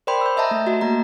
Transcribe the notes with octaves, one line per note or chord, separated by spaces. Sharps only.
A#4 C5 D5 G5 B5 C6
E6 G6
D#5 E5 A5 A#5
A3
F#4 D#5
A#3 F#4 A#5